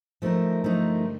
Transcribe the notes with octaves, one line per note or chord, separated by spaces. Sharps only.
D3 F3 A3 D#4 A#4
G2 F3 G3 A3 D#4 A#4